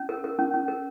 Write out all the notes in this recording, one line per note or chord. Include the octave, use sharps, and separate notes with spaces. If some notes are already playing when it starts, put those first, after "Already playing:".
Already playing: C#4
A#4
A#4
C#4
C#4
A#4